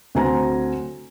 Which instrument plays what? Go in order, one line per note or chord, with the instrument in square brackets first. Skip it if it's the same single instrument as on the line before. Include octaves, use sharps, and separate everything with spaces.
[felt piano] D2 F#3 C4 G#5 A#5